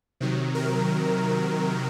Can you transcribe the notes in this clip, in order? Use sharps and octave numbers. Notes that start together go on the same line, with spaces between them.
C3 D#3 F#3
A#4